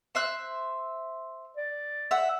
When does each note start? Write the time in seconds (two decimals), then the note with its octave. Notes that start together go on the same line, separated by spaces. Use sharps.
0.15 C5 E5 F#6
1.57 D5
2.11 E5 F#5